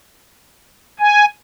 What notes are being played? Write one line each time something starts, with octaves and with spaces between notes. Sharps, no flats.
G#5